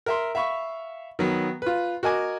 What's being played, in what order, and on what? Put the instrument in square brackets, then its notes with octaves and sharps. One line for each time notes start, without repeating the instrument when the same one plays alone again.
[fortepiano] A#4 E5 C6
E5 F5 B5 C#6
D#3 F#3 B3
F4 B4
F#4 A#4 D#5 G#5 D6